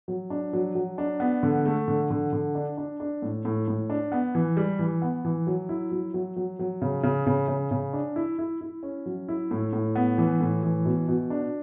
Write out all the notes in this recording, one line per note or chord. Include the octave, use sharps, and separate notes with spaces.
F#3
D4
F#3
F#3
D4
B3
D3
A3
D3
D3
D3
D4
D4
D4
A2
A2
A2
D4
B3
E3
G3
E3
B3
E3
F#3
E4
F#3
F#3
F#3
F#3
C#3
C#3
C#3
C#3
C#3
D4
E4
E4
E4
C#4
F#3
E4
A2
A2
B3
E3
A2
E3
B2
B2
D4